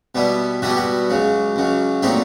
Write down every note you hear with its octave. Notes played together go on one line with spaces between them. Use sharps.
B2 G3 B3 E4
B2 G3 B3 E4 F#4
G4
F#4
C#2 C#3 F#3
C#2 C#3 F#3
A#2 F#3 A3 C4 D#4 G4